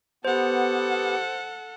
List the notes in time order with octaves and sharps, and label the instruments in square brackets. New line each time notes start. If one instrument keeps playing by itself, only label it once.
[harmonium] B3 [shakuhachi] G4 [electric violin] A4 F#5 [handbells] C5